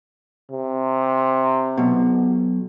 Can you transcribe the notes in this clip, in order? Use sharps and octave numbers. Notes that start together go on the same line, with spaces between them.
C3
B1 B2